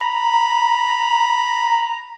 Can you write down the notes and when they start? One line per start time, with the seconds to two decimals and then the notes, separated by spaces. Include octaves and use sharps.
0.01 A#5 B5